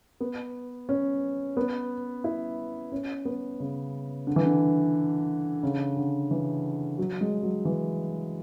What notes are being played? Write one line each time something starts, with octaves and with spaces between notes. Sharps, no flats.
B3
C#4
B3
E4
C#4
B3
C#3
D3
E3
D3
C#3
D3
E3
F#3
G#3
F#3
E3